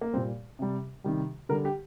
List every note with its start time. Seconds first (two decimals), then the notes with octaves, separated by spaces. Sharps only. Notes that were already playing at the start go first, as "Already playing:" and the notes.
0.01 A#3
0.13 G3 C4
0.17 A#2
0.59 C3 G3
1.04 C3 D#3 G3
1.49 D3 G3 A#4
1.65 G4